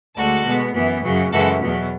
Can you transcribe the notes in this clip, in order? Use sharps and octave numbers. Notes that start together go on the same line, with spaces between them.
D2 D3 G#3 F#4 A4
B2 G#3 B3
F#2 E3 B3
F#2 C#3 F#3
F#2 C#3 E3 G#3 F#4 A4
E2 B2 F#3 B3